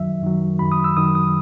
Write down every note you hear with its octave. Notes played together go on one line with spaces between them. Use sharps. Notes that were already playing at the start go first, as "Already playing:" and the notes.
Already playing: F#2 D#3 F#3 E5
F#2 D#3 F#3
F#2 D#3 F#3 B5
D#6
E6
F#2 D#3 F#3 D#6
D#6